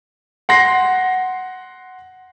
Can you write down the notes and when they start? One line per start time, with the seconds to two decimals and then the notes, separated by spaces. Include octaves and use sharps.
0.49 F#5 C6 A#6 C7